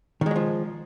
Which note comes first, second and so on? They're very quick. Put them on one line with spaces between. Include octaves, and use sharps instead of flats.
D#3 G#3 F#3 F3